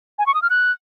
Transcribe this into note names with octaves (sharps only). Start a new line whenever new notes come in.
G#5
C#6
D#6
F6
F#6